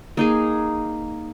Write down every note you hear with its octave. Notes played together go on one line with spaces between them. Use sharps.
A#3 D#4 G#4